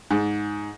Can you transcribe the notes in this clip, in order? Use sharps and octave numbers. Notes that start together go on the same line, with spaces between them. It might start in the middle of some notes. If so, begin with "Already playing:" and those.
G#2